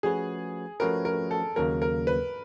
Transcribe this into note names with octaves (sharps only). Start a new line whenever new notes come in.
F3 A3 C#4 F#4 G#4 B4
F3 A3 C#4 F#4 A#4 B4
A#4
A4
D#2 C#3 F#3 A#3 A#4
A#4
B4